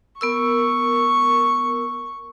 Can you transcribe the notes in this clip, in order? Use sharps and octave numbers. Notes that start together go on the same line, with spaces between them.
B3 A#4 C#6 E6